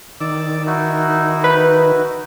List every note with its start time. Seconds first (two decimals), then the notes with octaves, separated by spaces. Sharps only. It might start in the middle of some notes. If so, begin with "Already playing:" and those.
0.21 D#3 D5 D6 E6
0.66 D#4 E4 F#4
1.44 B4